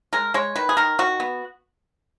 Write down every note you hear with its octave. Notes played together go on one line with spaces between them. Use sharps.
G#3 A#4
G#3 C#5
D#3 B4
G#4
D#3 A#4
D#3 F#4
B3